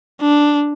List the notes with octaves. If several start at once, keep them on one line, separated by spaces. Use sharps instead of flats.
D4